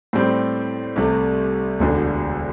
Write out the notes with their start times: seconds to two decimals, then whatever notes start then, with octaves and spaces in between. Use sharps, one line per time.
0.13 A2 G3 C4 G4
0.96 C2 C3 A3
1.79 E1 D2 D3